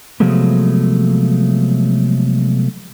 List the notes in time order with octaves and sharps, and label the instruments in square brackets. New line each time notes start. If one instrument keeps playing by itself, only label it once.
[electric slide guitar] C3 F3 F#3 G#3 A3 B3